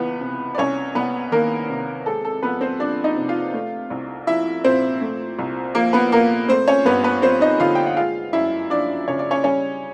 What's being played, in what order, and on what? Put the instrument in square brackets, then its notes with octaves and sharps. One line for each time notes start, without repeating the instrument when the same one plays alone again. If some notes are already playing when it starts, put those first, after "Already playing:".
Already playing: [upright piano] C#2 E3 B3 B4
C3
D5
C2 C#4 C#5
C2 B3 B4
D#3 A#3 A#4
C3
G#3 A4
A4
F2 B3 B4
C4 C5
F3 D4 D5
D#4 D#5
C3
F4 F5
A3
C2
F3 E4 E5
A#2 C4 C5
A3
C2
F3 A#3 A#4
B3 B4
A#2 A#3 A#4
A3 C4 C5
C#4 C#5
G2 B3 B4
B3 B4
F3 C4 C5
D#4 D#5
D3 F4 F5
G5
F#5
G#3 F4 F5
F#2 E4 E5
F3 D4 D5
C#3 C#5
D5
C#4 C#5
G3 C#4 C#5